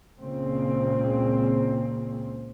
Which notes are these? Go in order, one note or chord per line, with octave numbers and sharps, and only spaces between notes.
C#2 A#2 C#3 C4